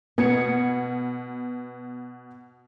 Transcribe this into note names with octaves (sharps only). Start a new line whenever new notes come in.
B2 B3 G#6 C#7